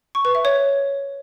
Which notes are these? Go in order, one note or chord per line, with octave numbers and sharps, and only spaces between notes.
C#6
B4
E5
C#5